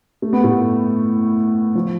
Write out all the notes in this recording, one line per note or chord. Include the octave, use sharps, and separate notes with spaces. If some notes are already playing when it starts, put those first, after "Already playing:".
A3
B3
A2 A3
F3